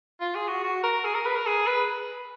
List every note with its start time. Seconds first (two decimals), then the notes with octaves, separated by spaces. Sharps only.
0.20 F4
0.35 G#4
0.48 F#4
0.63 F#4
0.83 A#4
1.04 G#4
1.14 A#4
1.26 B4
1.36 A#4
1.46 G#4
1.67 B4